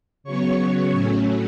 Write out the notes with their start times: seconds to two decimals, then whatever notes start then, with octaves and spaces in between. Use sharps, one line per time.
0.24 C#3 F#3 B3 C#5 C#6
0.91 A2 F#3 A3 C#4